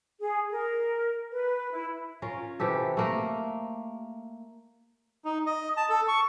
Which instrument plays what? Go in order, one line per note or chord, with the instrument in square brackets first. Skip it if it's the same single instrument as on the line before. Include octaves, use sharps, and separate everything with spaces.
[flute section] G#4
A#4
B4
E4
[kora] C#4 F4 A#4
C3 E3 G4 A4
A3 A#3 A#4
[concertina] D#4
D#5
A5
A4
C#6